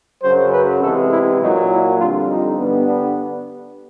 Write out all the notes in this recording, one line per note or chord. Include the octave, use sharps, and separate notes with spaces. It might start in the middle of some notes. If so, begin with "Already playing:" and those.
F#2 C#3 F#3 C5
B4
E2 C3 E3 G#3 A4
E4
A#2 F#3 A#3 D#4
E4
F2 D3 G3 F4
D#4
G2 D3 G3 B3
D4